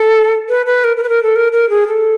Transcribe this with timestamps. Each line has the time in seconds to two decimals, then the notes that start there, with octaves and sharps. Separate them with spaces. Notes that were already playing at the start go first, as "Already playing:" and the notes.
Already playing: A4
0.49 B4
0.66 B4
0.84 A#4
0.97 A#4
1.03 B4
1.09 A#4
1.23 A4
1.36 A#4
1.52 A#4
1.69 G#4
1.88 A4